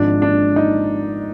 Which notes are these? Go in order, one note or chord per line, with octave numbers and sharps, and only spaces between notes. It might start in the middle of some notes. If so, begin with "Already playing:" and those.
Already playing: G#1 G#2 F3 D4
D4
D#4